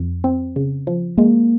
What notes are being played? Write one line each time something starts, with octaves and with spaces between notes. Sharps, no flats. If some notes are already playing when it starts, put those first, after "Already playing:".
Already playing: F2
C4
C#3
F3
G#3 A#3